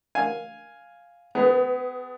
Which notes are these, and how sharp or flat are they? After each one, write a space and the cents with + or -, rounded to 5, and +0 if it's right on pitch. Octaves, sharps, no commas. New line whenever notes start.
F5 +0 G#5 +0
B3 +35 G#4 +0 B4 +5